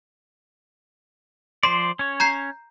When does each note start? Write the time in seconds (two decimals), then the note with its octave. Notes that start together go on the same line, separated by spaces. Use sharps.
1.63 F3 C5 D5 C6
1.99 C#4 C#5
2.20 A#5 G6 C7